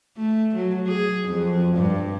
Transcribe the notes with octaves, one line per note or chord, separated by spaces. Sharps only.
A3
F#3
G#4
F2
G2